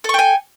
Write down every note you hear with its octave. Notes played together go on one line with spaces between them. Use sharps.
A4 G5 G#5 C#6